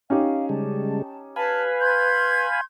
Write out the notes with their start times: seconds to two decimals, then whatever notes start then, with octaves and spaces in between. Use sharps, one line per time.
0.10 C#4 D#4 G4 F5
0.49 C#3 G3 G#3 A5
1.36 B4 F5 G#5 A5 B5
1.80 C6 G6 G#6